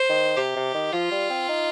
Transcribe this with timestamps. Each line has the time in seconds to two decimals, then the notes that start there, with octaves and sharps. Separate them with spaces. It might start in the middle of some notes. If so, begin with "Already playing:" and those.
Already playing: C5
0.09 D#3
0.37 C3 G4
0.56 C3
0.74 D#3
0.93 F3 F4
1.11 G3
1.30 C4
1.49 D#4